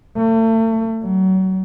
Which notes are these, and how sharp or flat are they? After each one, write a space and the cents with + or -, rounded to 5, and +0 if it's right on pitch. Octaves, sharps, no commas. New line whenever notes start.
A3 +35
F#3 +30